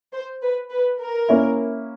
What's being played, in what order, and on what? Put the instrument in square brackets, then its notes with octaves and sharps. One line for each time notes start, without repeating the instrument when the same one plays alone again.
[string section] C5
B4
B4
A#4
[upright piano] A#3 C#4 E4